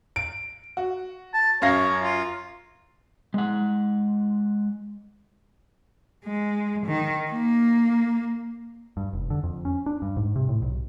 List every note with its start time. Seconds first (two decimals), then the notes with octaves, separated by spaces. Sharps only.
0.16 D7
0.77 F#4
1.34 A5
1.62 F#2 C#5 F5 A#6
2.02 F4
3.34 G#3 F#5
6.25 G#3
6.86 D#3
7.31 A#3
8.97 G2
9.13 F1
9.30 D3
9.43 F2
9.65 C#4
9.86 D4
10.02 G2
10.17 G#2
10.36 C3
10.49 A2
10.62 B1